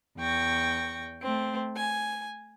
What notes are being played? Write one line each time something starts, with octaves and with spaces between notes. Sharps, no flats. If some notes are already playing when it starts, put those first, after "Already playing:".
E2 G5 C#6 A#6
A3 C4
G#5